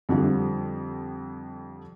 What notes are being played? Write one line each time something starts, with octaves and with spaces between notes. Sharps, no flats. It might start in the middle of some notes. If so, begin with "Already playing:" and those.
F2 D3 F3 G3